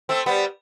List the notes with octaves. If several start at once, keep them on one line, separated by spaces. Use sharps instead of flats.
A3 C4
G3 B3